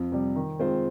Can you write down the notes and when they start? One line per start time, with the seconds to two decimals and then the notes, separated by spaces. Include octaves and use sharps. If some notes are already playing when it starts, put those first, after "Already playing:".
Already playing: F2
0.12 C3 G3
0.36 D#3
0.59 G#3 C4 F4 C5